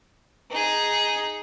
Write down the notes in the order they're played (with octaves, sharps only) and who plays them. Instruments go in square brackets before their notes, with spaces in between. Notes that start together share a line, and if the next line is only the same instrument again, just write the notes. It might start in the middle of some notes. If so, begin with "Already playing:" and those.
[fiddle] D#4 G#4